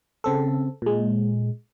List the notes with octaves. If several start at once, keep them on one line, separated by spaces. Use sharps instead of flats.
C#3 C4 A4
A#2 G#3